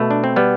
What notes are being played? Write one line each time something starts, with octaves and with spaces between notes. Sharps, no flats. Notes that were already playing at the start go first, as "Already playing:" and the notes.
Already playing: B2 A3
D4
C4
G3 B3